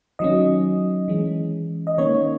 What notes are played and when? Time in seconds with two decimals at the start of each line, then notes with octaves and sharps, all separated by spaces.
0.19 D#3 F#3 C#4 D#5
1.08 E3 G#3 C#4
1.87 D#5
1.98 D#3 A#3 C#4 C#5